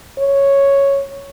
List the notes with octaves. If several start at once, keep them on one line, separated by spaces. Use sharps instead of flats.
C#5